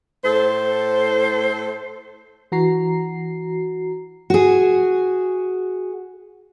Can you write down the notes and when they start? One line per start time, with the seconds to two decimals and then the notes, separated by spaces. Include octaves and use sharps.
0.24 A2 A4 C5
2.52 E3 F#4 A#5 C7
4.30 F#4 G#4